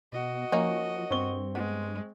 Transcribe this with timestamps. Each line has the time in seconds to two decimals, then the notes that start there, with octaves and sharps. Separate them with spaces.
0.12 B2 F#4 D#5
0.52 F3 A#3 C#4 D#4
1.10 G2 C4 C#6 G7
1.55 G#3 B3